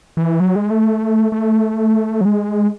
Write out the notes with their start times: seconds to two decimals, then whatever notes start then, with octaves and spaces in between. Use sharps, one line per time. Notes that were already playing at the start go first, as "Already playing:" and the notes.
0.17 E3
0.40 F#3
0.56 G#3
0.70 A3
1.32 A3
2.21 F#3
2.25 G#3